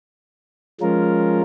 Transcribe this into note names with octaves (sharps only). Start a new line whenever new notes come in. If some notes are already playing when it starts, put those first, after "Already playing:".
F3 G#3 C#4 F4 A#4